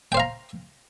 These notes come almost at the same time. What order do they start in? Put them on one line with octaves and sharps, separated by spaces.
G5 C5 F5 A#5